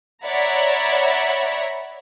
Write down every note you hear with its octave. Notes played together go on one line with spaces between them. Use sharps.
C#5 D5 E5 F#5 A#5 B5